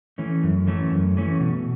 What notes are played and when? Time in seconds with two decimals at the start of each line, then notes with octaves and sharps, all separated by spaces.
0.18 E3 A3 C#4
0.43 F#2
0.67 E3 A3 C#4
0.91 F#2
1.17 E3 A3 C#4
1.40 B2